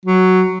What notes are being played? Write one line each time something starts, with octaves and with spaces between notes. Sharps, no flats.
F#3